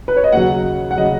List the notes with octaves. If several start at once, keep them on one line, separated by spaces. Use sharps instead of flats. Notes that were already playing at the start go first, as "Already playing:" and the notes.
B4
C#5
D#5
D#2 C#3 F#3 F#5
F#5
C#3 F#3 D#5